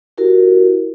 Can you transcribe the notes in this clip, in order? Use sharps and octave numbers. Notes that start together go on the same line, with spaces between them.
E4 F#4 G4 A#4